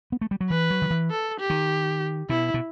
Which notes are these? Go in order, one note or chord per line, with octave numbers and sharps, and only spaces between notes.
B3
A3
G3
F#3
E3 B4
F#3
D#3
E3
A4
G4
D#3
B2 E4
B2